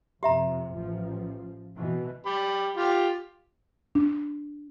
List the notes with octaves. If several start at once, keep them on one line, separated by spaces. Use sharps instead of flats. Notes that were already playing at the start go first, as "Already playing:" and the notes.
F2 C3 G4 E5 A#5
A1 F3
B2 E3
G4 B5
F4 G4
D4